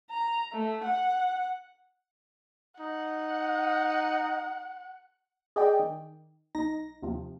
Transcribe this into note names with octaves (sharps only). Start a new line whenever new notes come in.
A#5
A3
F#5
D#4 F#5
G#4 D5 D#5 G5
D#3
B1 D#4 A#6
D#2 C3 F3